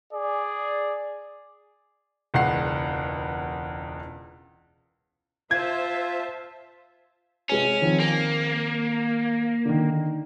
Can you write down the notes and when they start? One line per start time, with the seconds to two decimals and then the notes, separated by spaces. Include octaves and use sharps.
0.12 G#4 D5
2.34 E1 C#2 E3 F#5 C7
5.51 F4 C5 E5 A5 G#6
7.50 C3 G#3 C#4 B4
7.82 D#3 F3 C4
8.00 A#3
9.65 D3 D#3